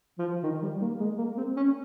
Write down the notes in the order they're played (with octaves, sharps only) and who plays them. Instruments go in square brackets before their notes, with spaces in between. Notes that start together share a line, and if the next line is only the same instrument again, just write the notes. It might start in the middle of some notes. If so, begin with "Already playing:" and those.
[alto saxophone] F3
D#3
G3
A#3
G#3
A#3
C4
C#4